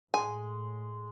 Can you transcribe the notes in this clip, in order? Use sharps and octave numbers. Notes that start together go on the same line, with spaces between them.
A2 G#3 G#5